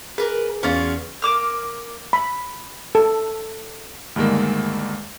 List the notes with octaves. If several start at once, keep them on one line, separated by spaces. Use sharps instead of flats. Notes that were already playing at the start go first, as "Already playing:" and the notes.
G#4 A#4 B4
E2 C#4 F4 F#4
A#3 D6 F6
B5
A4
D2 G2 D#3 G#3 A#3